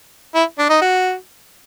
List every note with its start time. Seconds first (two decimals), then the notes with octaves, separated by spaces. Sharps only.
0.35 E4
0.58 D4
0.69 D#4
0.81 F#4